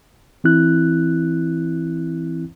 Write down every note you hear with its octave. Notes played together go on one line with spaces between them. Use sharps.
E3 C4 E4 F#6